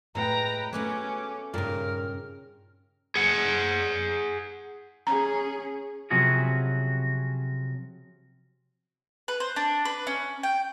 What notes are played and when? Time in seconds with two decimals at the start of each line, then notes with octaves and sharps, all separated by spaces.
0.15 A2 G#3 B4 G5 A#5
0.73 A3 B3 C#4 F#4 B4 C#5 D6
1.54 G2 A#2 C#3 D#4 A#4 F6
3.15 G#4 F#5
5.07 C#4 G#4 A#5
6.10 C3 F3 F#3 C#4 F#4 G#4
9.28 B4
9.40 C5
9.56 D4
9.85 B4
10.07 C#4
10.43 G5